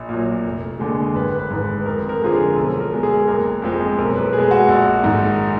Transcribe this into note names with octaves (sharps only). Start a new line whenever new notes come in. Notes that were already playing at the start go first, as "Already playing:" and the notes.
Already playing: A#1
A#2
F#3
F1
D#2 D3 G#3
G#1 B4
B4
G#2 D#3
B4
F2 A#4
A#4
D3 F3 G#3 G#4
A#4
B1
A#4
B2 G#3
G#4
F#1 A#4
F2 F3 G#3
B1 A#4
B4
B2 G#3 G#4
F#4
A#1
G#2 D#3